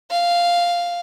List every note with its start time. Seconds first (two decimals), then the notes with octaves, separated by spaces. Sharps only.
0.11 F5